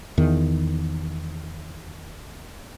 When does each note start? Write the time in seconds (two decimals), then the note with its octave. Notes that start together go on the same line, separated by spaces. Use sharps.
0.18 E2 D#3